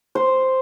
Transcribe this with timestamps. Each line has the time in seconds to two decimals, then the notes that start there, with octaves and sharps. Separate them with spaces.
0.15 C5